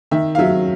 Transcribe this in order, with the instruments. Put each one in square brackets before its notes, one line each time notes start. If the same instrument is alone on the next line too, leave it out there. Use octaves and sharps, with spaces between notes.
[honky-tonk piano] D#3 E5
F5
F#3 E5